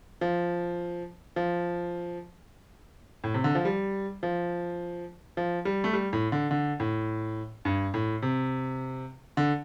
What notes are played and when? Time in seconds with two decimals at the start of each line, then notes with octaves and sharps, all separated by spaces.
0.21 F3
1.36 F3
3.24 A2
3.34 C3
3.44 D3
3.55 F3
3.65 G3
4.23 F3
5.37 F3
5.65 G3
5.84 A3
5.93 G3
6.13 A2
6.32 D3
6.51 D3
6.80 A2
7.65 G2
7.94 A2
8.22 C3
9.37 D3